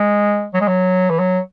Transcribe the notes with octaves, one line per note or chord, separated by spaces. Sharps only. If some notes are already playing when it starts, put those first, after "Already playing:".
Already playing: G#3
F#3
G#3
F#3
E3
F#3